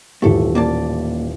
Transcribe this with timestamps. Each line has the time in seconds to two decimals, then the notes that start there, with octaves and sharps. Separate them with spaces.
0.22 D#1 A1 A3 G4 A4
0.55 A#3 D5 A5